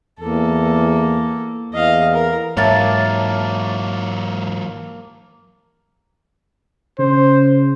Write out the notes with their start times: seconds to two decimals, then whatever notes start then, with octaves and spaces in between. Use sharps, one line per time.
0.20 E2 A#3 A4
1.73 E2 D#5 F5
2.14 A#4
2.57 G#2 E3 F#3 A#3 C#5 E5 A5
6.99 C#3 C5